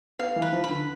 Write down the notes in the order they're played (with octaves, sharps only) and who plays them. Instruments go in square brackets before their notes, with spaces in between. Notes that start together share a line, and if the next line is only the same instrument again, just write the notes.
[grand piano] B3 [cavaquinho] F5
[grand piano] E3
[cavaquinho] B4
[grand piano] F3
[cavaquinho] B5
[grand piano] D3